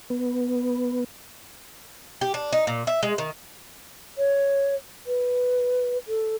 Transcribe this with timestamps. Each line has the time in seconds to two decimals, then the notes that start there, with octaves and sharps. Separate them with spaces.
0.10 B3
2.21 G4
2.34 D4
2.53 D#4
2.67 A#2
2.87 E5
3.03 G#3
3.18 D#3
4.18 C#5
5.06 B4
6.08 A4